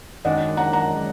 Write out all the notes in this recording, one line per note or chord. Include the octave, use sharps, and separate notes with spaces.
F#2 D#3 G#3 D4 D#5 F#5
F#5 A#5
F#5 A#5